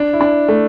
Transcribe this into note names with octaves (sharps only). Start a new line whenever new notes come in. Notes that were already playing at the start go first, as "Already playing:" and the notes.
Already playing: D4
E4
D4
A3